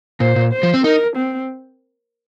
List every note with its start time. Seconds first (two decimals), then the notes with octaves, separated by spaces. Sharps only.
0.20 A#2 C5
0.36 A#2
0.52 C5
0.63 F3
0.74 C4
0.84 D#4 A#4
1.16 C4